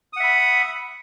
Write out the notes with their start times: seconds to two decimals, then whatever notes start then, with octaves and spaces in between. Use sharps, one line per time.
0.13 D#6
0.17 F#5
0.20 E5
0.24 B5